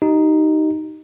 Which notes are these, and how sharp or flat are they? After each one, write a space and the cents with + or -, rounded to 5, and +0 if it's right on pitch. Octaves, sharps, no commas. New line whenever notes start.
D#4 +0 G4 -35